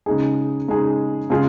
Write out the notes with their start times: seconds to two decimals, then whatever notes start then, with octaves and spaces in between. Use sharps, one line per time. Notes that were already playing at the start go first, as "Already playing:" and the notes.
0.06 C#3 G#3 D#4 G#4
0.68 C#3 G#3 D#4 G#4
1.30 C#3 G#3 F4 G#4